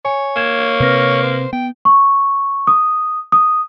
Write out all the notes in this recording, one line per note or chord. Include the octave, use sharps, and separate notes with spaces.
C#5 G#5
A#3 G#6 E7
C3 C4 B4 F6 A#6
C5
B3 G5
C#6
D#6
D#6